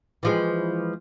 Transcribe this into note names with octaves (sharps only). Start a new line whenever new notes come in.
E3 F3 G#3